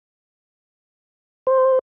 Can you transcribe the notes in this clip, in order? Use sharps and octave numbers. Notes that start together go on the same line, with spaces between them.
C5